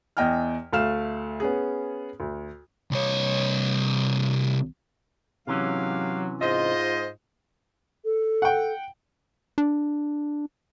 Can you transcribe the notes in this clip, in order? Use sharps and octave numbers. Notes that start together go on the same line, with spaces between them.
E2 D#5 G5 G#5 F6
D2 A3 F5 F6 E7
B3 C#4 G#4
D2
C2 C#5
G#2 C3 E3 F#3 C#4 G4 F5
G#2 F4 C5 D#5
A4
F#5 G5
D4